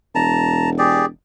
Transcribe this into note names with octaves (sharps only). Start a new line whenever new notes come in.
E1 A5 A#5
G4 G#4 D5